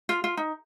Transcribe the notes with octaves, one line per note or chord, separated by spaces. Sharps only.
F4
F4
D#4